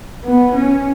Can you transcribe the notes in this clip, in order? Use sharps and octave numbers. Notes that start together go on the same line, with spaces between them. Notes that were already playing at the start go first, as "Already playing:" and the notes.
B3
C#4